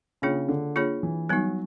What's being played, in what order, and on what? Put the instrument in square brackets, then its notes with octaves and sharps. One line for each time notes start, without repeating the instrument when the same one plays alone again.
[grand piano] C#3 [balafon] A#3 D4 F4 G#4 C#5
[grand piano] D3
[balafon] A#3 D4 F4 G#4 C#5
[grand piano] E3
[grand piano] F#3 [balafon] G3 B3 D#4